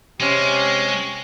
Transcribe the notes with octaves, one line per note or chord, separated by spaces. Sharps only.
C3 G#3 C#4